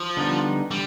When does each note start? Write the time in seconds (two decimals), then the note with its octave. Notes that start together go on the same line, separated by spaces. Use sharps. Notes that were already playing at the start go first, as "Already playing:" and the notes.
Already playing: F3
0.17 D3 G3 B3 D#4
0.71 D3 G3